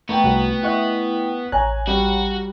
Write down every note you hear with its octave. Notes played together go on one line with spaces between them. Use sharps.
A3 B3 G5 A#5 B5 C#6
C2 F#4
E4 D#5 F#5 C#6 F#6
A1 C#5 G#5 A#5 F#6
G3 F#4